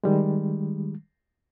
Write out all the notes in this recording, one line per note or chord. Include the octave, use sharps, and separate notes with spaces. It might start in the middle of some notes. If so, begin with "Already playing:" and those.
D#3 G3 G#3